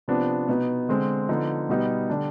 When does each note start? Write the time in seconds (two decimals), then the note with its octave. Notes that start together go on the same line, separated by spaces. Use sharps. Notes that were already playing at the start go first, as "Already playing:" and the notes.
0.08 C3 F3 B3 D4
0.48 B2 B3 D#4
0.89 D3 G#3 C4
1.29 D3 F3 B3 D#4
1.69 B2 G3 B3 D#4
2.09 D3 G3 D4